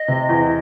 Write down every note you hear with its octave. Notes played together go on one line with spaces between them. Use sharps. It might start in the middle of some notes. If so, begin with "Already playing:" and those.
Already playing: D#5
C3
E2